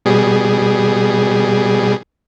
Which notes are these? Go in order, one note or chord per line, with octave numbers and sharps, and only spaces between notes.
B2 G3 G#4